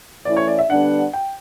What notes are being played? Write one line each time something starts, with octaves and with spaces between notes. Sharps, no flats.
E3 A3 C#4 E4 D5
C#5
D5
E5
D3 G3 B3 D4 F#5
G5